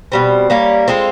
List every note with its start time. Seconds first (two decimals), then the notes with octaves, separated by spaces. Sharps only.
0.12 B2 G3 C4
0.50 G3 A#3 C#4
0.88 G#3 C4 F4 A4